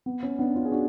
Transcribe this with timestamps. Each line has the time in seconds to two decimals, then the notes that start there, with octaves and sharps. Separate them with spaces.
0.06 B3
0.23 C#4
0.38 B3 D4
0.55 C#4 F4
0.65 G#4
0.72 D4 F#4